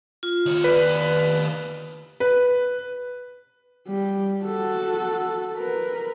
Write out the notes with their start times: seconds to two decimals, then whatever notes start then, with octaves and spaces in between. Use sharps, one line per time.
0.23 F4
0.46 D#3 C#5
0.64 B4 D5
2.20 B4
3.88 G3
4.44 F#4 A4
5.57 A#4 B4